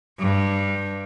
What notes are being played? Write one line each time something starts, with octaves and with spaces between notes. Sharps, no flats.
G2